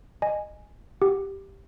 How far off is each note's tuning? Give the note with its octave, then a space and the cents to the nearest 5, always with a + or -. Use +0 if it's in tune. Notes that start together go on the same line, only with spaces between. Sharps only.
D#5 -20 G#5 +0
G4 +0 F#5 +0